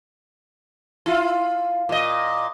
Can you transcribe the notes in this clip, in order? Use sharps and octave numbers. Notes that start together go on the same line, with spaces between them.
E4 F4
A#2 D#5